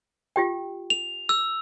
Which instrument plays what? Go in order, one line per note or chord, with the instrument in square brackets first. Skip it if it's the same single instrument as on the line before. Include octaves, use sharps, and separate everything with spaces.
[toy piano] F4 G4 G5
[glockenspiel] F7
E6